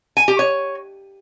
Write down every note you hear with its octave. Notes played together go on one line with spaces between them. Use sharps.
G#5
G4
C#5